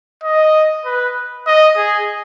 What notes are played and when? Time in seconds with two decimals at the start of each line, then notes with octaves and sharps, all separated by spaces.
0.24 D#5
0.85 B4
1.47 D#5
1.77 G#4